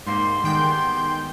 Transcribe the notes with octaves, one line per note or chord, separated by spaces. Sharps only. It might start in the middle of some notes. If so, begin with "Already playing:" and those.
G#2 G3 A#3 C6
D#3 G3 G#3 B3 G5 G6